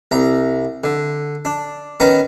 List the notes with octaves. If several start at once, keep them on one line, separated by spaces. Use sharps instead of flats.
C2 A#5
D3
D4
D#3 B3 C#4 A#5